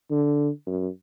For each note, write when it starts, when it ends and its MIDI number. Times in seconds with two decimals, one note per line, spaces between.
0.11 0.49 50
0.67 0.89 42